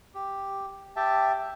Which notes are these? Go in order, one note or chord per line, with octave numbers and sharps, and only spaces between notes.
G4
G4 E5 G5 A5